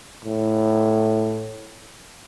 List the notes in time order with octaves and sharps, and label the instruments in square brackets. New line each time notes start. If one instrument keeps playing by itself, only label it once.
[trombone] A2